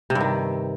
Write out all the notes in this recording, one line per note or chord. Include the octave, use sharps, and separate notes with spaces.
C3
G2
D#3